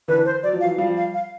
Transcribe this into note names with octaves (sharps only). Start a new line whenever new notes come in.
D3 E3 B4
C5
F#3 D5
F3
E3 F#3 F5
F3 G3 F5
F5
F5